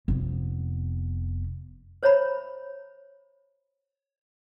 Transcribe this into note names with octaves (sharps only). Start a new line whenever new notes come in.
F1 B3
C5 C#5 E5 A#5 B5